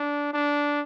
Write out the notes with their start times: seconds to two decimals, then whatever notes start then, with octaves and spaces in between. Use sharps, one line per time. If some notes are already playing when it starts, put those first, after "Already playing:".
Already playing: D4
0.33 D4